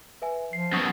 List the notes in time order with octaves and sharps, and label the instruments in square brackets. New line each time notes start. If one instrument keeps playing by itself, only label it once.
[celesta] B4 E5 G#5
[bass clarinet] F3 [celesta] C7
[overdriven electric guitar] F#2 B2 [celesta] C#6 D#6 C7